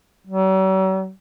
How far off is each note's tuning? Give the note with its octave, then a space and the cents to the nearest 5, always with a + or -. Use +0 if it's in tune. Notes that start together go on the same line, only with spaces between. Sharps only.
F#3 +45